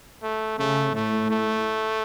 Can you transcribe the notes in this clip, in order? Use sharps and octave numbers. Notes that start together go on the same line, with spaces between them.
A3
C#3 A3
A2 A3
A3